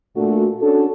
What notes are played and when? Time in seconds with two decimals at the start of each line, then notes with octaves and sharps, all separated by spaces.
0.16 A#2 A3 D4 F#4
0.62 C#4 D4 F#4 A4